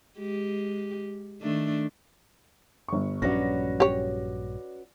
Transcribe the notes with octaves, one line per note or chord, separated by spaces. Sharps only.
G#3 G4
D#3 A3 D4
G1 C#6
A#1 G2 F#3 C#4 F#4 B4 D5 A#6
G4 C#5